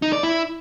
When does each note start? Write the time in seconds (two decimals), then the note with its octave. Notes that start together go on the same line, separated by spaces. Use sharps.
0.02 D#4
0.13 D5
0.23 E4